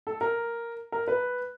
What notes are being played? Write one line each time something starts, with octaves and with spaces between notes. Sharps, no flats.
A4
A#4
A#4
B4